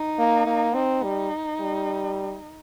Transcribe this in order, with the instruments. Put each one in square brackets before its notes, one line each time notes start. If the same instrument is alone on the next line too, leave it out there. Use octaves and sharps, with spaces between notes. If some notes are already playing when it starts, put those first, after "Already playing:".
Already playing: [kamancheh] D#4
[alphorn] A#3
A#3
[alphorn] C4 [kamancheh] D#4
[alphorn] G3
G3